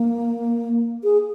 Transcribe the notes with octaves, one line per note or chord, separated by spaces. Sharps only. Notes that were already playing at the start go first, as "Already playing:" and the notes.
Already playing: A#3
G#4